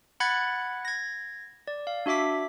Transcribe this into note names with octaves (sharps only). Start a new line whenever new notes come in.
F#5 B5 F#6 G#6 A6 C#7
G#6 A#6
D5
F5
D4 F#4 E5 D6 B6